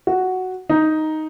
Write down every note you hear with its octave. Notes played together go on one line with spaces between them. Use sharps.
F#4
D#4